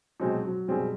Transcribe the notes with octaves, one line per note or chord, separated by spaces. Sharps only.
B2 F#3 G#3 C4 D#4 G#4
F#3
B2 G3 G#3 C4 D#4 G#4